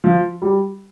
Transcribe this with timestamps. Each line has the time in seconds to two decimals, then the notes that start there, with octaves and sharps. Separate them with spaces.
0.04 F3
0.42 G3